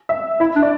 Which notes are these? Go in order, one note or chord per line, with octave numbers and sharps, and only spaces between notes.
E5
E4 E5
D4
D5